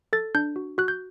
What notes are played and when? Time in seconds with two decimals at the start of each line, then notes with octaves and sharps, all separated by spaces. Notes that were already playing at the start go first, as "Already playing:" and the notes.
0.13 A4 A6
0.35 D4 G6
0.56 F#4
0.78 F#4 F#6
0.88 G6